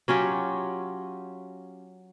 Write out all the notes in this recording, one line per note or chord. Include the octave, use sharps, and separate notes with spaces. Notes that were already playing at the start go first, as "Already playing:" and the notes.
F#3 C#4 F4 G4